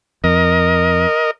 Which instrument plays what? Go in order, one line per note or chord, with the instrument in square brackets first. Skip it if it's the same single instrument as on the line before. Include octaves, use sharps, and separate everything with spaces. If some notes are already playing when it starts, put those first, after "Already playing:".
[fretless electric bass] F2 [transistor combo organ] A#4 D#5